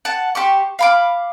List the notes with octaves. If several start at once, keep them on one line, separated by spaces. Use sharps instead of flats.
F#5 A5
G4 C5 C#6
F5 B5 D6